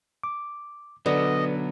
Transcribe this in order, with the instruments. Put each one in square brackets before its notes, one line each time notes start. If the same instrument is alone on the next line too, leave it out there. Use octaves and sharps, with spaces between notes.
[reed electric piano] D6
[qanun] D3 [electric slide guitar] F#3 B3 [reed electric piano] B4 D5 [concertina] D#5